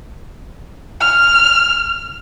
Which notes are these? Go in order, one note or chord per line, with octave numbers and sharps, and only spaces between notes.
F6